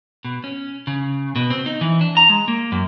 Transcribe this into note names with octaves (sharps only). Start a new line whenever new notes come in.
B2
C#4
C#3
B2
C4
D#4
E3
D4
A#5
G#3
A#3
F#2